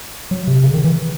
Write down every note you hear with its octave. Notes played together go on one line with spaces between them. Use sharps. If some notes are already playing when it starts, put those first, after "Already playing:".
F#3
C3
C#3
D#3
E3